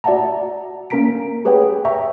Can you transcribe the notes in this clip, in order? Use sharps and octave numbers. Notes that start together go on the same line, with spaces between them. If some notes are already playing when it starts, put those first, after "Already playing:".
F#4 D5 E5 F#5 A5 A#5
A#3 C#4 A#4 A#5 B6 D7
G4 G#4 B4 C#5 F#5 G5
C#5 E5 G5 A#5 C#6